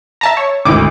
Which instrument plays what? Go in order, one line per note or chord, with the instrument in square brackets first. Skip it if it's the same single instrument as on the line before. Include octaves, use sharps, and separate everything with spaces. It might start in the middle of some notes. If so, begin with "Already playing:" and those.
[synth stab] E5 A5 A#5
C#5
[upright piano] G#1 D2 [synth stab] E4 D6